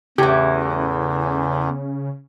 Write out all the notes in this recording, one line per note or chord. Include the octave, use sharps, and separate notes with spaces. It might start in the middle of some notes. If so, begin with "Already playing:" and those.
E2 A2 C#3 E3 G4